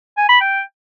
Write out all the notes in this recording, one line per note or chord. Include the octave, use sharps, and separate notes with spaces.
G#5
B5
G5